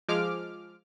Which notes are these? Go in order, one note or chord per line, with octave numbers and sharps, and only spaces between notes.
F3 G#3 D6 F6